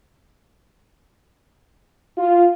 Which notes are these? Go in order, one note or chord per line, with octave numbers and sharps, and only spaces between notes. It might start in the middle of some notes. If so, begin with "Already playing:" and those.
F4